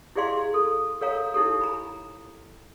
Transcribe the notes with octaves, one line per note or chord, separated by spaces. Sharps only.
E4 G4 G#4 D5 F5 C6
A4
A4 A#4 C#5 F5 A#5
D#4 E4 G4 A4
A#5 B5